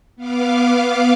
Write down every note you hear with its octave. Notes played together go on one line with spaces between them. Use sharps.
B3 F5 D6